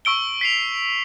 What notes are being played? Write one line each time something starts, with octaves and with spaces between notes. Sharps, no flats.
C#6 E6 D7 G7
B6 C7 F7